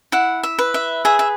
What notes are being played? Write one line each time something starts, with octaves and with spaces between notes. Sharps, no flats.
E4 F#5
E5
B4
E5
G#4 E5
E5